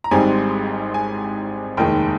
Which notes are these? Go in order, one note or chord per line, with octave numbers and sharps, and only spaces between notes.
A#5
G#1 G#2 G3 C4 D#4 G#5
G#5
F1 D#2 D#3 G#3 D#4 G5